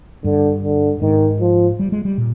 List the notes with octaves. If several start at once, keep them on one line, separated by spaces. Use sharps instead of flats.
G2 D3
D3
G#2 D#3
F3
G3
G#3
G3
A#2